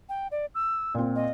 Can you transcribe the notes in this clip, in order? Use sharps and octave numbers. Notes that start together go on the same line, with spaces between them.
G5
D5
E6
A#2 C4
D#5